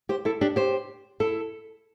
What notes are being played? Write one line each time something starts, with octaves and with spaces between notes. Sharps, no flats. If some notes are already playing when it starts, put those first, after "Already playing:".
G4 C5
E4 A4
D4 G4
G4 C5
E4 A4